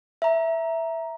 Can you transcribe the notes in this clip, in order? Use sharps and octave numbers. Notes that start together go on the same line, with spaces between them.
E5 A#5